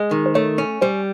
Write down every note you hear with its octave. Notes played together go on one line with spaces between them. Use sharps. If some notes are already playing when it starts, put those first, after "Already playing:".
Already playing: G#3
D#3
C5
A3 C#5
C#4 C#5
G3 C5